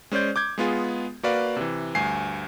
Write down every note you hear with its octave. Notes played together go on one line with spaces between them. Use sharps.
G#3 C#4 C5 D5 G6
D6 G6 G#6
G#3 B3 F4 G#4
A#3 F#4 B4 D5 F5
C3 E3
D2 G2 G#5 C7